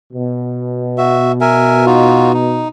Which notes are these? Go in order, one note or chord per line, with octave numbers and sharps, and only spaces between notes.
B2
F#4 E5
A#4 E5 G#5
D#4 F4 F#4
D#4